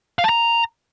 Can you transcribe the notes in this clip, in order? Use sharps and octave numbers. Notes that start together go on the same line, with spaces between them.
F5
A5
A#5